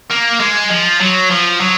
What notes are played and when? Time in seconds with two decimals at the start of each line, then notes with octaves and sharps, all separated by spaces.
0.10 A#3
0.40 G#3
0.70 F3
1.01 F#3
1.31 F3
1.61 F#3